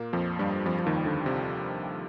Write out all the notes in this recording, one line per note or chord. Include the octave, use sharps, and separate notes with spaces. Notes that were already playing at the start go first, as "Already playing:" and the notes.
Already playing: A#2 A#3
F2 F3
G2 G3
F2 F3
F3
D#2 D#3
D3
C3